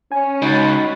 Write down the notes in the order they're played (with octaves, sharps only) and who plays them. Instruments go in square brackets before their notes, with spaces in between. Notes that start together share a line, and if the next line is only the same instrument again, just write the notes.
[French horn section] C#4 [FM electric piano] G#5
[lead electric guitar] C#2 [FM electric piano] D#4 A6 [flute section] F#4 B5